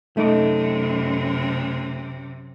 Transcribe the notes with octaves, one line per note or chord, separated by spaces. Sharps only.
F#2 C3 A3 D#4